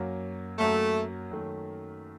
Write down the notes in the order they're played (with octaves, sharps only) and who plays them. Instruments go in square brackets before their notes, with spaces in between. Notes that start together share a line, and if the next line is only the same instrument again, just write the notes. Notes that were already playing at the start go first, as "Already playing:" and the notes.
Already playing: [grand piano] F#2 F#3 A#3
[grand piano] F#2 F#3 A#3 [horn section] A3
[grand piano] F#2 D#3 A3